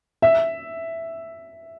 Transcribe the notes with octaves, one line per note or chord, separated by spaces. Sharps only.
E5